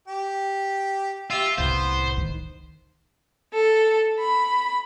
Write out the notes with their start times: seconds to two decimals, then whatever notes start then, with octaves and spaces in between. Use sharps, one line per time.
0.08 G4 G5
1.30 F4 G4 E5 E6
1.58 C2 A2 B3 C5
2.18 D#3
3.53 A4
4.20 B5